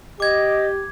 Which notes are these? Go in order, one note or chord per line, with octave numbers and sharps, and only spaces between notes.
G4 D#5 D6 G#6